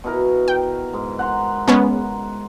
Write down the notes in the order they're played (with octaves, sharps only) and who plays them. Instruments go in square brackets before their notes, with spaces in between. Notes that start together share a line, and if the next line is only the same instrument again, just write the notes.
[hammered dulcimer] B2 E4 A#4
[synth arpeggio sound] G5
[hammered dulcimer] G#2
F#5 A#5 C6
[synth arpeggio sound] G#3 B3 C#4